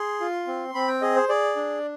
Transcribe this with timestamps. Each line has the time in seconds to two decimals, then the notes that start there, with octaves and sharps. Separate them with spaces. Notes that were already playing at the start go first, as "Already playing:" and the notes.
Already playing: G#4 C6
0.20 F4
0.47 C4
0.74 C4 B5
0.88 G5
1.02 G#4 D#5
1.16 C5
1.29 G#4 D5
1.56 D4